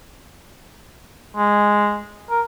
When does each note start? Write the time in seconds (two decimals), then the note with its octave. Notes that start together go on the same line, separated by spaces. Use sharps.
1.37 G#3
2.30 A#4